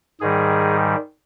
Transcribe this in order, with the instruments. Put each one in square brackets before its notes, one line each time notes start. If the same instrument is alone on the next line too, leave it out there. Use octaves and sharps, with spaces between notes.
[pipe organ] G#2 D#3 G3 G#4